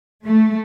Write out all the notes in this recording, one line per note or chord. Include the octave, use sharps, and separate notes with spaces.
A3